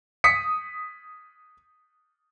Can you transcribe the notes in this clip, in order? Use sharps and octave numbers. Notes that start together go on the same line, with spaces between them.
D#6 B6 C#7